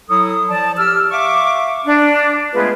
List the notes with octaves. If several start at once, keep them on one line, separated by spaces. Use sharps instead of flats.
F#3 E4 A4 D#6
F3 D5 A5
G4 E6 F6
E5 F5 C#6 D6
D4
G#3 A3 B3 F4 G#4 B4